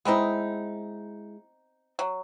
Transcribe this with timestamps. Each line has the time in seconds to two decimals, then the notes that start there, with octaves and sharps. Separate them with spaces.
0.05 G#3 B3 C4 D#4 E4
1.99 F#3